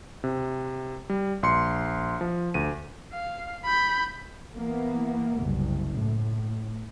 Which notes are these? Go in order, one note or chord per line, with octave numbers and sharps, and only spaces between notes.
C3
G3
A#1 C6 C#7
F3
D2 D#7
F5
B5 G6
E3 A#3 B3
F#1 C2
A2